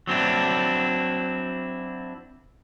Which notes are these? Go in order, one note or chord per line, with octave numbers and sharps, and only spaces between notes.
F#3 C4 D4 E4